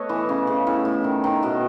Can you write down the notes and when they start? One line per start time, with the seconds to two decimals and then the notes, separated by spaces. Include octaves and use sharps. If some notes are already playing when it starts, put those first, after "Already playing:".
Already playing: A3 B3 B4 C#5 D#5
0.09 E3
0.29 C#3
0.47 C#3
0.67 A2
0.85 A2
1.04 D#3
1.24 D#3
1.43 B2 D#5